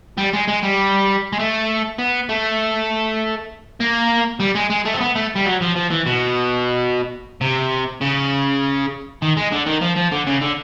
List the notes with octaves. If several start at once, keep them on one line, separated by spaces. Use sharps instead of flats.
G3
G#3
G#3
G3
G#3
A3
B3
A3
A#3
G3
G#3
G#3
A3
C4
B3
A3
G3
F#3
F3
F3
E3
B2
C3
C#3
D#3
G#3
D3
D#3
F3
F3
D3
C#3
D3